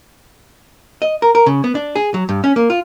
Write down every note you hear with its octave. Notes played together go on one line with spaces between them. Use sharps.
D#5
A#4
A#4
C#3
B3
D4
G#4
F#3
G2
C#4
A#3
F4